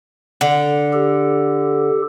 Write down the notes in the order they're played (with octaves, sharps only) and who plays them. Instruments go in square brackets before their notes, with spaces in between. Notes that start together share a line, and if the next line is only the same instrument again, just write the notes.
[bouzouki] D3
[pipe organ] G4 A4